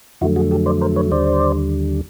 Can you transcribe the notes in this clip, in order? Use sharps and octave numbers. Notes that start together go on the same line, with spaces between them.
F2 D3 F#3 A3 E4 F#4
F#4 G#4
G4 A4
C5 D5
A#4 C5
B4 C#5
D#2 D3 G3 C5 D5